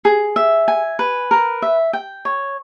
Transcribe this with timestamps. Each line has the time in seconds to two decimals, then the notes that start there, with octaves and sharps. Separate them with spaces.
0.05 G#4
0.36 E5
0.68 G#5
0.99 B4
1.31 A#4
1.62 E5
1.93 G5
2.25 C#5